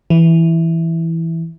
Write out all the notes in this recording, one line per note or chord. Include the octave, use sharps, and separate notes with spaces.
E3